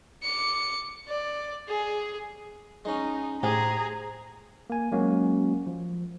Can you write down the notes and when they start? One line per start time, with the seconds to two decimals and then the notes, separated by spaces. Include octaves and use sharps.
0.23 D6 C#7
1.08 D5
1.68 G#4
2.85 G#3 C#4 D#4
3.43 A2 G4 G#4 C5 G#5 A#5
4.70 A#3 G#5
4.92 F#3 G#3 A#3 C#4 F#4
5.67 F3